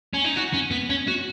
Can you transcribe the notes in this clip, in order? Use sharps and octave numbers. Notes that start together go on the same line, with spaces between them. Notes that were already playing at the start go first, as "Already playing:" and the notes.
C#4
D#4
F#4
C#4
B3
C#4
F#4